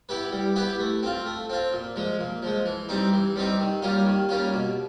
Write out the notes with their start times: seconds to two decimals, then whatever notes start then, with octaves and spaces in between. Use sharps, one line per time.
0.09 B3 E4 G4 B4
0.32 G3
0.56 B3 E4 G4 B4
0.79 A3
1.03 C4 F4
1.26 A3
1.50 C4 F4
1.73 A#2
1.96 F3 G#3
2.19 A#2
2.43 F3 G#3
2.66 E3
2.89 G3 C4 D#4
3.13 E3
3.36 G3 C4 D#4
3.59 D#3
3.82 G3 A#3 C#4 F4
4.05 D#3
4.29 G3 A#3 C#4 F4
4.53 B2